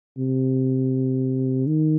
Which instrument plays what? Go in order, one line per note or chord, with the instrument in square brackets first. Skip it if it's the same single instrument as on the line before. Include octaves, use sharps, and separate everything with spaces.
[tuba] C3
D#3